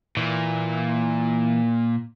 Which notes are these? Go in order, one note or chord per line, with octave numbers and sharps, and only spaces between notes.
A#2 E3